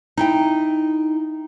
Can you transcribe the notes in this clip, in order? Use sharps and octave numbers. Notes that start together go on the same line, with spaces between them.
D#4 E4 G5